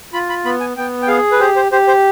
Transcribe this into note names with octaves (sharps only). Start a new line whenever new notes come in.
F4 B5
B5
B3 B5
G#5
B3 G5
G5
G#4 F5
B4
G4 C5
C5
G4 C5
C5